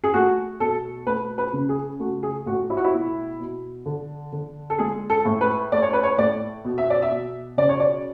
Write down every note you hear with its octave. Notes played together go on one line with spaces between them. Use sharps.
G#4
A3 F#4
B2 A4
A3 B4
B4
C#3
G#4
A3 F#4
G#4
A2 F#4
E4
F#4
E4
B2
B2
D3
D3
A4
G#3 G#4
A4
A2
B4
A3 D5
C#5
B4
C#5
A2 D5
B2
E5
D5
E5
B2
C#3 D5
C#5
D5